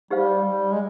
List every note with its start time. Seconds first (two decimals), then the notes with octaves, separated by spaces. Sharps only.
0.10 G3 D#4 G4 C5 F5
0.44 G3
0.72 G#3